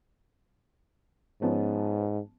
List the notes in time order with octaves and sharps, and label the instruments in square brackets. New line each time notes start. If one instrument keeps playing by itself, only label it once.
[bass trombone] G#2 [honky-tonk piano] F3 B3 C#4